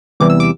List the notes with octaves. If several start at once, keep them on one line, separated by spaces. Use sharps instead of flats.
E2 C3 E3 G3 D6
E6
D6